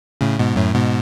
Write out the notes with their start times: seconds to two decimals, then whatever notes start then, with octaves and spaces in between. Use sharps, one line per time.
0.21 A2 C#3
0.39 G#2 B2
0.56 F#2 A2
0.74 G#2 B2